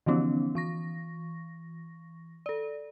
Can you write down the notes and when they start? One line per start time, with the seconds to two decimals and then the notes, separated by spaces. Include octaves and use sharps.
0.06 D3 E3 F3 B3 C#4 D#4
0.55 E3 C#6 A#6
2.46 A4 D5